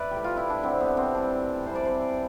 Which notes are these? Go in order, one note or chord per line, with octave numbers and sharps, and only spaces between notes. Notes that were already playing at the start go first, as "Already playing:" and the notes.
Already playing: B4 D5 E5
A2 G3 G4
F4
E4
D4
D3 G3 C4
B3
C4
A2 E3 G3 D4
C3 E3 G3 C5
D5
C5